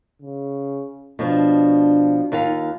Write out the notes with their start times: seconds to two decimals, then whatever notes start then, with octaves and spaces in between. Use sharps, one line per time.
0.22 C#3
1.19 B2 F3 D4
2.32 D#2 F4 F5